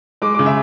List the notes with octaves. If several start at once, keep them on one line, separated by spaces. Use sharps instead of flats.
G#3 D6
C#3 D6
E5